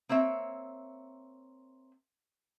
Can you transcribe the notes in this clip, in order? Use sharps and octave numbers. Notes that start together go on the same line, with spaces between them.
A#3 C4 C#5 E5